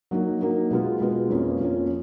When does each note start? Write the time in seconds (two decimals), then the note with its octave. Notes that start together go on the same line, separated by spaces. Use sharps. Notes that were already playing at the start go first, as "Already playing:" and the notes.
0.11 F#3 A#3 D#4 A#4
0.41 F#3 A#3 D#4 A#4
0.70 B2 G#3 B3 F4
1.00 B2 G#3 B3 F4
1.30 F2 F3 A#3 C#4
1.60 F2 F3 A#3 C#4